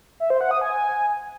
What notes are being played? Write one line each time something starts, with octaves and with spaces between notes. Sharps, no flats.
E5
C5
F#5
D#6
G#5